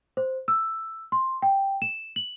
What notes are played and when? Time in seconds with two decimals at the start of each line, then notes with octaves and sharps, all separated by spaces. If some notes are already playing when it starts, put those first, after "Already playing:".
0.17 C5
0.48 E6
1.12 C6
1.42 G5
1.82 E7
2.16 F#7